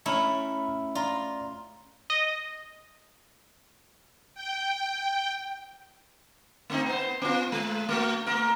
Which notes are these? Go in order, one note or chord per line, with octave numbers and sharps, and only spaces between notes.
A3 C#4 E4 A#5 B5 F6
F4 D5 A#5
D#5
G5
A3 C4 D#4
B3 C5
B3 F4
G#3
A3 F#4
A3 A#4